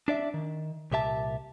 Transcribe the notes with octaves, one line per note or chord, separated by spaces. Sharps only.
D4 D5 E5
D#3
C2 A#2 G4 E5 A5